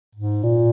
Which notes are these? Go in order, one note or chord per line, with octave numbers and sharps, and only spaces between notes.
G#2
A#2